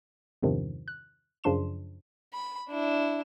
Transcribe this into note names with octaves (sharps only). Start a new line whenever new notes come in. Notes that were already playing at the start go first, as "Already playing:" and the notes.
E2 G2 C3 D#3 F3
F#6
F#2 C#3 F3 D4 C6 E7
B5
D4 E4